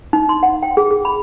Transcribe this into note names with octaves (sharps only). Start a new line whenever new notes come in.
D#4
C6
F#5
G5
G#4
G#4
B5